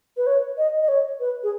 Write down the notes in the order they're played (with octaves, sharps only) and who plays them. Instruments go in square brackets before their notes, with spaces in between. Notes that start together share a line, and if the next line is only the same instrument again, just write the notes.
[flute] B4
C#5
D#5
D#5
C#5
B4
G#4